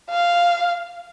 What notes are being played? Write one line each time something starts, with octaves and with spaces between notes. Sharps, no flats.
F5